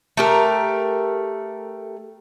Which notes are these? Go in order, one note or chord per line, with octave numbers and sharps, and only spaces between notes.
A3 G4 A#4